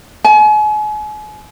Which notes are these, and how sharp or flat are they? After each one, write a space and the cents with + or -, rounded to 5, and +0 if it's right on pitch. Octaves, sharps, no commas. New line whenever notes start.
G#5 +40